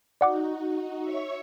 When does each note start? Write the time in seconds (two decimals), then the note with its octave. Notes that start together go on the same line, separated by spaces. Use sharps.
0.21 D#4 F#4 D5 F#5 D6
1.03 C#5 E5 C#6